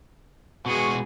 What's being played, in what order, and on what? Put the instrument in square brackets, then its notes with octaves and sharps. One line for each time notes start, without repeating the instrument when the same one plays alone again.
[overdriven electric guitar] B2 G#3 [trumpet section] B3 C#6 [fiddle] F#4 G#4